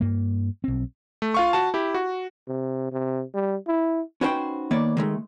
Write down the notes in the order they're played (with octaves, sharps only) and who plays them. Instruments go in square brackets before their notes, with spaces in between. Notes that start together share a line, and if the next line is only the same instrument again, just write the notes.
[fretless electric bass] G2 A#3
B1 C4
[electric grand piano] A3
F4 F5 C#6
F#4 A5
E4 G4
F#4
[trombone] C3
C3
G3
E4
[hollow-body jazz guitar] C#4 D#4 F#4 B4 C5 G5
D#3 A#3 B3 C#5 D5
D#3 G#3 A3